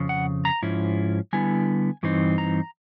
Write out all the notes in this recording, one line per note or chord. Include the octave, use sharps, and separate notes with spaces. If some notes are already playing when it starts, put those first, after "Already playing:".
Already playing: F2 C#3
F#5
A#5
G#2 F3 C#4 E4
D3 G3 B3 E4 G#5
G2 E3 C4 D#4
A#5